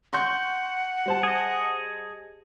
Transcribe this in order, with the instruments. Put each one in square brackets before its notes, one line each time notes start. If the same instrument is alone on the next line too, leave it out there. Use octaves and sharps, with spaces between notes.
[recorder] F#5 [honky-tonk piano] C6 C#6 G6
[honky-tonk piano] G3 C5 A5
[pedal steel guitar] G#4 D#5